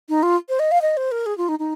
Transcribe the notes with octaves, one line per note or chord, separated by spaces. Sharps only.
D#4
F4
C5
D#5
F5
D#5
C5
A#4
G#4
F4
D#4
D#4